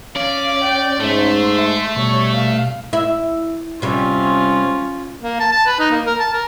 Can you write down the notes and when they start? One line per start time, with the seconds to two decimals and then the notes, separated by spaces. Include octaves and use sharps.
0.16 C#4 D5 F5
0.63 G5
1.00 G#2 A3 C6
1.58 E5
1.96 B2 G3 C#5
2.35 F5
2.93 E4
3.82 C3 G3 C#4 F4
5.22 A#3
5.40 A5
5.52 A5
5.66 B4
5.80 D#4
5.91 A#3
6.06 A#4
6.19 A5
6.33 A#4